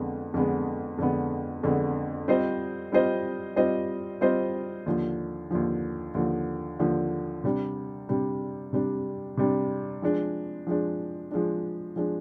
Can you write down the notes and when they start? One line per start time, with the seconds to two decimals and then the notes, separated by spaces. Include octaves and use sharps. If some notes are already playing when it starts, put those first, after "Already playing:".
Already playing: F2 D3 G#3 B3
0.34 F2 D3 G#3 B3
0.98 F2 D3 G#3 B3
1.63 F2 D3 G#3 B3
2.28 G3 C4 F4 C5 D#5
2.92 G3 C4 F4 C5 D#5
3.56 G3 C4 F4 C5 D#5
4.21 G3 C4 F4 C5 D#5
4.86 D#2 D3 F3
5.51 D#2 D3 F3
6.15 D#2 D3 F3
6.79 D#2 D3 F3
7.44 C3 G3 D4
8.09 C3 G3 D4
8.73 C3 G3 D4
9.37 C3 G3 D4
10.02 F3 G#3 D4
10.67 F3 G#3 D4
11.31 F3 G#3 D4
11.96 F3 G#3 D4